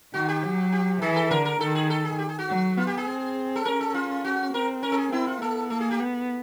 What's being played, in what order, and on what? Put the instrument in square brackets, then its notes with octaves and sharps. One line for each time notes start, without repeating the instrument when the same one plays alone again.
[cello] D#3 [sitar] F#4
[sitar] G4
[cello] F#3
[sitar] G4
[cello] E3 [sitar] G#4
[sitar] A4
[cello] D3 [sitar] A#4
[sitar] A#4
[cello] D#3 [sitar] A4
[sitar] G#4
A4
G#4
G4
G#4
F#4
[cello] F#3
[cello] B3 [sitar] F4
[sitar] G4
G#4
[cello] C4
[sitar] A4
[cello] C#4 [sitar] A#4
[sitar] A4
F4
F#4
[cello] C4 [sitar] A#4
[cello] C#4 [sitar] A#4
[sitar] A4
G#4
[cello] C4 [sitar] E4
[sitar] F4
[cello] B3 [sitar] A4
[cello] A#3 [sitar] A4
[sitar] G#4
G4
[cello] B3